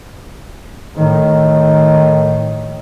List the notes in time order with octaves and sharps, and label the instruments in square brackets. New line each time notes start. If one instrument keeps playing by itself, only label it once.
[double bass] A2 D#3